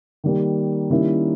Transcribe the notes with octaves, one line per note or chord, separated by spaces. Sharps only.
D#3 G3 A#3
D#3 G3 A#3 C#4 E4